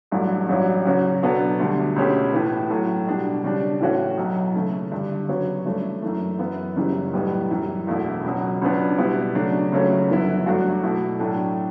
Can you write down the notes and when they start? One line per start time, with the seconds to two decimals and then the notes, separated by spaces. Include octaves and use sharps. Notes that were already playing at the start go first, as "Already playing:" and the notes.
0.11 A1 G2 F#3 A3 E4
0.49 A1 G2 F#3 C#4 E4
0.85 C#3 F#3 C#4 F#4
1.22 B2 F#3 B3 D4 A4
1.59 D2 D3 G3
1.96 C#2 B2 A3 C#4 G4
2.33 A2 E3 B3
2.70 A2 F#3 A3
3.07 B2 G3 D4
3.44 C#3 G3 D4
3.80 A2 E3 A3 C#4 F#4
4.18 B1 B2 F#3
4.55 C#3 E3 A3 E4 A4
4.92 G2 D3 G3
5.28 C#3 F#3 B3 F#4 C#5
5.66 G2 E3 A3 C#4 E4
6.02 F#2 E3 A3
6.39 F#2 E3 B3 E4
6.76 F#1 F#2 C#3 E3 G3
7.13 B1 A2 G3 B3
7.51 F#2 E3 G3
7.87 E1 E2 B2 A3 E4
8.24 C#2 B2 F#3
8.61 C#2 C#3 F#3 B3 D4
8.98 B2 G3 B3 E4
9.35 C#3 F#3 A3 D4
9.72 C#2 C#3 F#3 A3 C#4
10.09 G1 F#2 E3 B3 E4
10.46 G2 F#3 A3 D4 F#4
10.83 B2 A3 E4
11.19 A2 F#3 A3 D4 A4